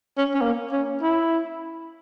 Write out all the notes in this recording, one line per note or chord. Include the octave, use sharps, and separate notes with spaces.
C#4
C#4
A#3
C#4
E4